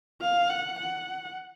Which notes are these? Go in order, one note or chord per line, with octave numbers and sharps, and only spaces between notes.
F5
F#5
F#5